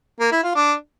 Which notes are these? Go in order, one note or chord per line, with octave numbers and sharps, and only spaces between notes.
A#3
E4
F4
D4